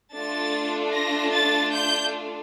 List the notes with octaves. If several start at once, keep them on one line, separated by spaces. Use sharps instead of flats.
A3 D4 F4 A6
A#6
A6
G6